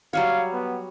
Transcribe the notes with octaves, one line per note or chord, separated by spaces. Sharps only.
F#3 G3 C#5 F5
B3